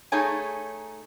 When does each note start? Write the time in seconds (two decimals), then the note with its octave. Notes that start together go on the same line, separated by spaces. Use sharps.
0.12 A3 D#4 G#4 C#5 G#5